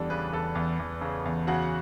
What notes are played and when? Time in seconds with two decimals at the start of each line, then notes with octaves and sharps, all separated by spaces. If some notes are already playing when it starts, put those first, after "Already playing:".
Already playing: E2 G3 D4 A4 D5
0.10 C#3 B3 B4
0.32 E2 A4
0.55 E2
0.79 E2
1.01 C#3
1.25 E2
1.47 C#3 F#4 F#5